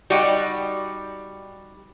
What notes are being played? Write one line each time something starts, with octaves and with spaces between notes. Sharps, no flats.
G3 D#4 F#4 D5 G5